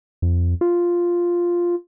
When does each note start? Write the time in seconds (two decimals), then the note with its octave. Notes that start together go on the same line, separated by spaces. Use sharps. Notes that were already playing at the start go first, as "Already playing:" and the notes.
0.22 F2
0.61 F4